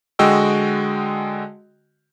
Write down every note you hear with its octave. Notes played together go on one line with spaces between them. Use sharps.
D3 G#3 F#4 D#5 G5 E6